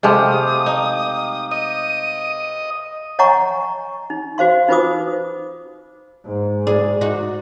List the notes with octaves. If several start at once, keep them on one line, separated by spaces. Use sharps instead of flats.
C3 G#3 A3 G4 F5 D#6
D#4
D#5 D#7
C#5 D#5 F#5 G#5 A#5 C#6
D#4
F#4 C5 F5 C6
D#4 F4 B4 C5 D6 D#6
G#2
G#4 D5
D#4 F#4